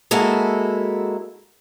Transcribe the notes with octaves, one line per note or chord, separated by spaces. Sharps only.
G#3 A#3 E4 F#4 A4